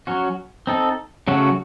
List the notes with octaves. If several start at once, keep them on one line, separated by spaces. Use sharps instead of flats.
F#3 C#4 F#4
C4 D#4 A4
C#3 F#3 A3 C#4 F#4